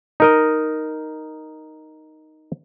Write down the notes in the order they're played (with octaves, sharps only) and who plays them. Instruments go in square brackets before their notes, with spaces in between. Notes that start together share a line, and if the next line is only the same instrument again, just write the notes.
[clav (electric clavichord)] D#4 A#4 D#5